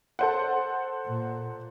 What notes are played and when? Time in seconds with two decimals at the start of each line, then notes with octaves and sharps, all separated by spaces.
0.19 A4 C5 F#5
1.06 A#2